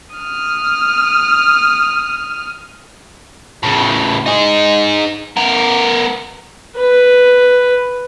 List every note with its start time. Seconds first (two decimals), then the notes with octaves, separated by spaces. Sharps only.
0.16 D#6 F6
3.63 A2 C#3
4.26 D#4 G#4
5.37 B3 A#4
6.78 B4